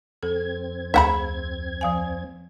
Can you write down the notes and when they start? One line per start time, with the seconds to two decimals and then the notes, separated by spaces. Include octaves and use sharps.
0.23 F2 C4 A4 G#6
0.94 D2 A3 G#4 E5 F#5 B5
1.81 F3 F5 G#5